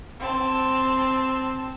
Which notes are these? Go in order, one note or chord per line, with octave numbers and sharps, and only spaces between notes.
C4 A5